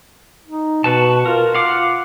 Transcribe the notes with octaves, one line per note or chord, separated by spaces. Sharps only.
D#4
B2 F#4 B4 A5
F4 A#4
F5 F#5 D6